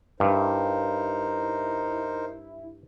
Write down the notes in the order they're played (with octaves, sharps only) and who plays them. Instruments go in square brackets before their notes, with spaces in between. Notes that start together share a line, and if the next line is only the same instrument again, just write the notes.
[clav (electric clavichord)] G2 [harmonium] D#4 A#4 C5 [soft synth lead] E4